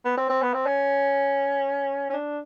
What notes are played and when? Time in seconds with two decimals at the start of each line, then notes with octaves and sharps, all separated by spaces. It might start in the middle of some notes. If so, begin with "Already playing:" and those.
0.05 B3
0.17 C4
0.29 C4
0.42 B3
0.54 C4
0.66 C#4
2.10 C#4
2.13 D4